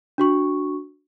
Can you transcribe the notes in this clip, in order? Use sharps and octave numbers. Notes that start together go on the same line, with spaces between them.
D4 F#4 C#6